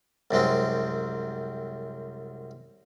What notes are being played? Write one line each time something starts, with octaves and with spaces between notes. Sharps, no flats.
C2 F#2 G#3 C4